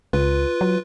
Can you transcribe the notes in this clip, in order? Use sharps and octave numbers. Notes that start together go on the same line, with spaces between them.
C#2 F4 B4
F#3